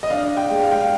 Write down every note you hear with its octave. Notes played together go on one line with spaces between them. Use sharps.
D#5
D4 F5
G5
G#3
F5
G5
F5